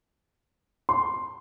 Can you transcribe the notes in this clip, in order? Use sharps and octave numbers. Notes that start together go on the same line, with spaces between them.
C6